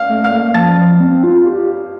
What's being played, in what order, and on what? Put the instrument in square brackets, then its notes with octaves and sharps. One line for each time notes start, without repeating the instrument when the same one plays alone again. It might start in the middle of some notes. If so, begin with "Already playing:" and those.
Already playing: [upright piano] F5 F6
[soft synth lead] A3
[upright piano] F5 F6
[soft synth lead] A#3
[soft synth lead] F3 [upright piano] A5 A6
[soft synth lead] F3
C4
F4
G4